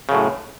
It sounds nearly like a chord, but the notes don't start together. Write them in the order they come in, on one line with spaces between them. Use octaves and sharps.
C#3 F#2 A2